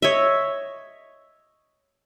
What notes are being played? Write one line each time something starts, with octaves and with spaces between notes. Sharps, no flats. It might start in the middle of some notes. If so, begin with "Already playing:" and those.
C#5 D#5 E5